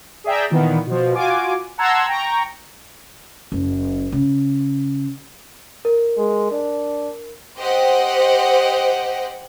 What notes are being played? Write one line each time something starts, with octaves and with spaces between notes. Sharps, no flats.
G#4 D5 E5 G5 A#5
A#2 D#3 E3 B3
B2 F3
F4 F#4 G#5 D6
F#5 A5 A#5 C6 E6 G#6
G5 A#5 C#6
F#1
C#3
A#4
G#3
D4
G4 C5 D#5 F#5 G5